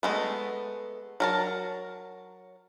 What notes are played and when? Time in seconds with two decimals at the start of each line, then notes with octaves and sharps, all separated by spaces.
0.03 G#3 A3 B3
1.20 F#3 A#4 A5